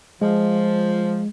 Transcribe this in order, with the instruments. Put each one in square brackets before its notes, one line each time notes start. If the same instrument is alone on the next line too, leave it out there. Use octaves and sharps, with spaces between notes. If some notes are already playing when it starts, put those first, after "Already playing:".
[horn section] F3 [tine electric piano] G#3